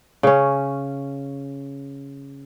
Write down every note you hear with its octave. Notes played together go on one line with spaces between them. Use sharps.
C#3 C#4